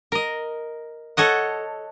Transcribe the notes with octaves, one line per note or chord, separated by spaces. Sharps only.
A#4 D#5
A4 C#5 D#5 F#5